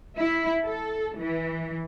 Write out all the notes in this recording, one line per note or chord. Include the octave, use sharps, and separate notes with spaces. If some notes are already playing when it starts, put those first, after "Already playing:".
E4
A4
E3